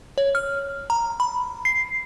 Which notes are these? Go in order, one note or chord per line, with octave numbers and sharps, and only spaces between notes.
C#5
F6
A#5
B5
C7